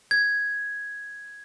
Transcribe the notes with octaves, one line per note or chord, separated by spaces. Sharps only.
G#6